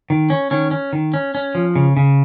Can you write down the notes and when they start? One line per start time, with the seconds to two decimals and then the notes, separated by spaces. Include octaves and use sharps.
0.10 D#3
0.30 C#4
0.51 D#3 C#4
0.71 C#4
0.93 D#3
1.14 C#4
1.35 C#4
1.55 F3
1.76 C#3
1.97 C#3